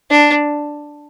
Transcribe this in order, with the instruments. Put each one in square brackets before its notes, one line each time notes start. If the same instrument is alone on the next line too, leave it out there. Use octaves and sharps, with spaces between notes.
[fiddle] D4